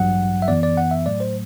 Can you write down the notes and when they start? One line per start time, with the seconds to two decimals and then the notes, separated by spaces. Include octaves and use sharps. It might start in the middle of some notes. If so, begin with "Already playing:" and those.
Already playing: A1 G2 F#3 F#5
0.42 E5
0.48 F#2 E3 B3 D5
0.63 D5
0.77 F#5
0.91 E5
1.06 A2 F#3 A3 D5
1.20 C5